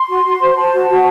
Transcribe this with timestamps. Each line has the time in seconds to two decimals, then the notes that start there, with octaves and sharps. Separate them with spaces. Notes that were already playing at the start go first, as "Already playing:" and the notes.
Already playing: C6
0.08 F#4
0.24 F#4
0.41 C5
0.57 C5 A5
0.72 F#4
0.89 F#4